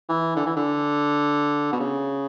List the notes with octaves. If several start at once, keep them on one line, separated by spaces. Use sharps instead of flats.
E3
D3
E3
D3
B2
C#3